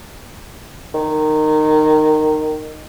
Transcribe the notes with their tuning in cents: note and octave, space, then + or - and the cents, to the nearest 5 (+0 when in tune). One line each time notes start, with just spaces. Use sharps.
D#3 -15